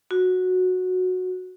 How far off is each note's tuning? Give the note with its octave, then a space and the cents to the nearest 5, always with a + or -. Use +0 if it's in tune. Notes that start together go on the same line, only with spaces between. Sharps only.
F#4 -10